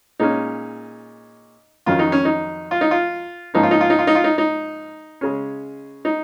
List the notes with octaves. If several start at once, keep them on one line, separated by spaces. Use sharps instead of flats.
A#2 G#3 C#4 D#4
F2 D#3 F#3 C#4 F4
D#4
C#4
D#4
F4
D#4
F4
G#2 F3 A#3 C#4 D#4
F4
D#4
F4
D#4
F4
D#4
F4
D#4
D#4
C#3 G#3 C#4
D#4